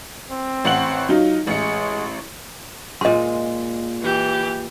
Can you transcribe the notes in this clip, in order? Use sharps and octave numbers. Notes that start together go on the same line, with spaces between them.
C4
A1 F#5 F#7
F#3 D#4 F4
A1 G#3 C#7
A#2 G#3 D#5 C6
E3 G4